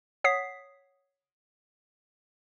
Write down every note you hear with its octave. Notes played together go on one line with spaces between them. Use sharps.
C#5 F#5 D#6 B6 C7